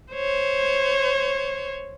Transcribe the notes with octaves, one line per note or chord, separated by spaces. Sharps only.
C5 C#5